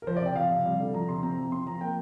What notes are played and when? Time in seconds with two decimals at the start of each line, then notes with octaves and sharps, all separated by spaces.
0.02 A#4
0.07 F3 C5
0.16 D5
0.21 C3 G5
0.36 F3 F5
0.50 C3
0.65 G3
0.80 D3
0.94 F3 A#5
1.08 C3 C6
1.23 C4 A#5
1.37 F3
1.52 C4 C6
1.66 F3 A#5
1.81 A#3 G5